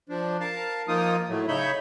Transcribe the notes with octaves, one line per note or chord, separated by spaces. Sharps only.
F3 D4
A#4 F5 A5
F3 A#3 D#4 F4 A#4 D#6
A2 F#3 A3
C#3 D#4 C#5 E5 B5 G6